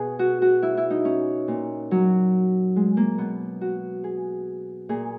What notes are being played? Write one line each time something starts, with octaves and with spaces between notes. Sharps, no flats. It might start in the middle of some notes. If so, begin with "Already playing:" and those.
Already playing: B2 G#4
F#4
F#4
E4
E4
D#4
C#4
A#2
F#3
G#3
A#3
B2 B3
F#4
G#4
A#2 G#4